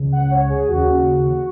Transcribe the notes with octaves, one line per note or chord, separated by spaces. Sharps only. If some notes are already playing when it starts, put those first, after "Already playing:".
Already playing: C#2 C#3
F#5
C#5
G#4
D#2 C#3 F#4